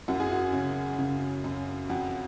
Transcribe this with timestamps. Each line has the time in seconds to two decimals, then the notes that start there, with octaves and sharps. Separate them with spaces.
0.08 F#2 F#4
0.20 G#4
0.32 F#4
0.53 C#3
0.98 C#3
1.44 F#2
1.90 F2 F#4